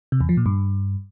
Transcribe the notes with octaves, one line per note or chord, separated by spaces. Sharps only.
C3
E2
F3
A#2
G2